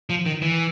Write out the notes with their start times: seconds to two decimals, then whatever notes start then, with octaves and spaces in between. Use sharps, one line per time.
0.10 F3
0.26 D#3
0.42 E3